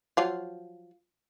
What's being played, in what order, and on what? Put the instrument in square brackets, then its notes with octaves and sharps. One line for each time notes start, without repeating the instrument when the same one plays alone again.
[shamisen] F3 F#3 F4